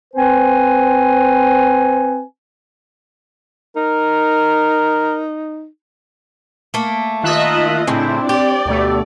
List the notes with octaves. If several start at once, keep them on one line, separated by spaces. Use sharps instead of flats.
C4 B4 C5 G#5
D#4 A#4
A3 A#3
D#3 F4 D#5 E5 F#6
A2 C#3 C4 D4 E4
G4 D5
D2 B2 A3